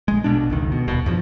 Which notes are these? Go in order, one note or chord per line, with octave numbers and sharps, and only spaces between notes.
A#1 G#3
B1 B2 D4
F1 C#2 D#3
B2
D#1 C2 B2
E2 G2 F3